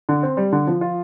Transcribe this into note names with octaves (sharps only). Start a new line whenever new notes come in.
D3
C4
G3
D3
F3
F4